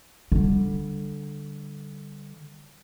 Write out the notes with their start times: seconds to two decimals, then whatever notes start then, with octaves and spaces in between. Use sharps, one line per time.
0.32 D3 G3